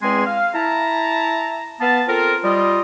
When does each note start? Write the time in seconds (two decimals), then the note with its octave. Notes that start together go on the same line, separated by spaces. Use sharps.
0.01 E2 G#3 C4 G#4 G#5 C6
0.25 F5
0.54 E4 A5 A#5
1.81 B3 F5 A5
2.08 C4 F4 A4 A#4
2.43 G3 F4 D#5